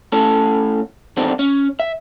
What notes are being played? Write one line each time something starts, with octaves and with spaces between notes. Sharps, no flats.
A2 C#4 A4
E2 D3 D#3 G3 C4 D4
C#4
E5